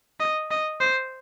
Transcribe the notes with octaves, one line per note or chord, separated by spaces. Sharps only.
D#5
D#5
C5